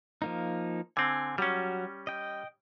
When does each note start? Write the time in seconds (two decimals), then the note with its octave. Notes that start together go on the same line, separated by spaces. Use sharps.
0.22 F3 A#3 D#4
0.97 D3 C4 G#5
1.38 F#3 G3 C#4 F#4
2.07 D#5 G5